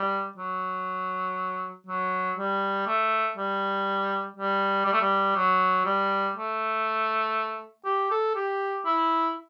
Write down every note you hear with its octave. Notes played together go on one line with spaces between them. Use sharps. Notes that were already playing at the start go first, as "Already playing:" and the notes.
Already playing: G3
F#3
F#3
G3
A3
G3
G3
G3
A3
G3
F#3
G3
A3
G4
A4
G4
E4